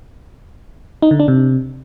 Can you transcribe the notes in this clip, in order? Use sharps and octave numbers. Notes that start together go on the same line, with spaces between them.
D#4
D3
D4
C3